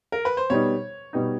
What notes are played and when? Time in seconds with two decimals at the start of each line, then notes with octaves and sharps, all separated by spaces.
0.12 A#4
0.25 B4
0.37 C5
0.50 B2 G3 B3 D#4 C#5
1.13 B2 G3 B3 D#4